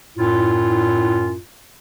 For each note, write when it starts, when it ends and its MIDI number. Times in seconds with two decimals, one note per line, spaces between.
0.18 1.37 42
0.18 1.37 45
0.18 1.37 64
0.18 1.37 65